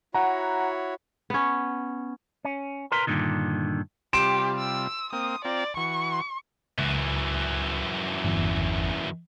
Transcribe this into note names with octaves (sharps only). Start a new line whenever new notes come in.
E4 F#4 C#5 F#5 A#5
B3 C#4
C#4
A#4 B4 A#5 C6
G2 A#2 D3 D#3
C3 G3 F4 G4 C6 D7 E7
E6
A#3 C4 D#6
C4 F4 D5 A#5
E3 F#4 C#6
C#2 F#2 E3
G1 E2